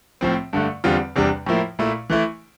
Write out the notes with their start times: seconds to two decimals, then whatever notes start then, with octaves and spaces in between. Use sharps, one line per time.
0.21 A2 F3 C4
0.53 G2 D3 A3
0.84 E2 D3 G3 C4 F4
1.16 E2 C3 G3 D4
1.46 A2 F3 A#3 E4
1.79 A#2 A3 E4
2.10 E3 A3 E4